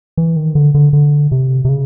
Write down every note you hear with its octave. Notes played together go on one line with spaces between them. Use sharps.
E3
D#3
D3
D3
D3
C3
C3
C#3